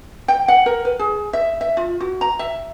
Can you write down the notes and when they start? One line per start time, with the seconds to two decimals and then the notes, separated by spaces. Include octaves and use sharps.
0.28 G5
0.48 F#5
0.66 A#4
0.85 B4
0.99 G#4
1.33 E5
1.61 E5
1.77 F4
2.00 F#4
2.21 A#5
2.39 E5